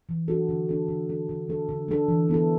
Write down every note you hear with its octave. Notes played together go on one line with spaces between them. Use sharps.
E3
D4 F#4 A4
D3
A3 D4 A4
D3
A3 D4 A4
D3
A3 D4 A4
D3
A3 D4 A4
E3
B3 E4 A4